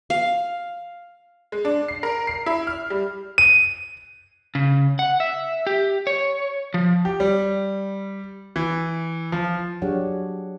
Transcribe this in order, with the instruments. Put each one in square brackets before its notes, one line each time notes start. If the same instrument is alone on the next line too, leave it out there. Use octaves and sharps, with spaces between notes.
[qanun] F5
[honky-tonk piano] G#3
D4
C7
A#4
C7
E4
F6
G3
[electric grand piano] D#7
[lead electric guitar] C#3
F#5
E5
G4
C#5
F3
[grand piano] G4
G3
E3
F3
[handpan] F#3 D4 G4 G#4 C#5 F#5